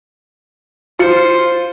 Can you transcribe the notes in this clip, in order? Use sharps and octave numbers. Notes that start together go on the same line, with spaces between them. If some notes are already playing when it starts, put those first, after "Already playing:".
F4 C5 C#7